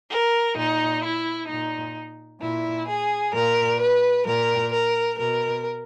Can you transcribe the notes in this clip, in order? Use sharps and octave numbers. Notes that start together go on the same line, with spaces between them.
A#4
A#2 D#4
E4
A#2 D#4
A#2 E4
G#4
A#2 A#4
B4
A#2 A#4
A#4
B2 A#4